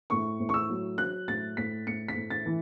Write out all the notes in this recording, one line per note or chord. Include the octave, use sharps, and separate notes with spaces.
A2 C#6
A2
C#6
E6
F#3
F#3 F#6
A2 A6
A2 B6
A2 C#7
B6
A2
A6
E3